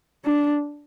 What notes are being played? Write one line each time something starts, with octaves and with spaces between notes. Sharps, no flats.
D4